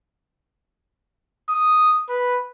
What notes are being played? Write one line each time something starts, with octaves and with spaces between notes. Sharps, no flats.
D#6
B4